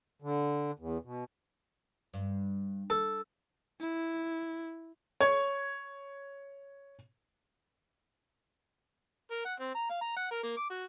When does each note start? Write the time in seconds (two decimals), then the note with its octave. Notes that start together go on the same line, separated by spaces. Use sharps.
0.22 D3
0.79 E2
1.04 B2
2.14 G2
2.90 A4
3.80 E4
5.20 C#5 G#6
9.31 A#4
9.45 F#5
9.60 C4
9.75 A#5
9.90 F5
10.01 A#5
10.16 F#5
10.31 A#4
10.43 A#3
10.57 D6
10.70 F#4